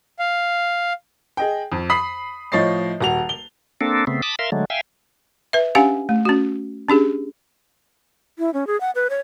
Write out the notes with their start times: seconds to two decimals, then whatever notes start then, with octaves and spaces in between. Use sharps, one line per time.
0.19 F5
1.37 G#4 D#5 G5
1.72 F2
1.90 B5 D#6 B6 C7 F#7
2.52 A2 F3 C#5 D#5 A6 C7
3.00 D#1 F#4 F7
3.29 G7
3.81 A#3 C4 D4 A4
4.07 C#3 A3 B3 C4
4.22 A5 B5 D6 D#6
4.39 A#4 E5 F5 C6
4.52 D3 F#3 G#3 A3
4.70 E5 F5 G5 G#5
5.53 B4 E5
5.75 C#4 D4 G4 F5 F#5 G#5
6.09 A3
6.25 C#4 F#4
6.89 C#4 D4 G4 G#4
8.39 E4
8.54 C#4
8.67 G#4
8.81 F#5
8.95 B4
9.10 C#5